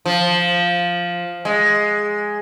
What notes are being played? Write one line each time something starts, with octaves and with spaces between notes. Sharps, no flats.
F3
G#3